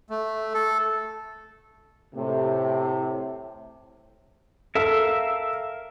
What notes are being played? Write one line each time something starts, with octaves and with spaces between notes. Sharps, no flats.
A3
A4
A2 C3
A4 A#4 E5 F5 E6